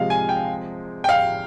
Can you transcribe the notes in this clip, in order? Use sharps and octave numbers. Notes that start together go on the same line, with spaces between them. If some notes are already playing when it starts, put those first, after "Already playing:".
Already playing: C3 F3 G#3 F5
G#5
G5
G5
F5